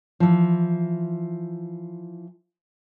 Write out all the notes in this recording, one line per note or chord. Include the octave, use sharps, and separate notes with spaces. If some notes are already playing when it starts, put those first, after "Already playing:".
E3 F3